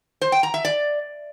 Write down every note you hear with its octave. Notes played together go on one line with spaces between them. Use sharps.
C5
G5
A#5
E5
D5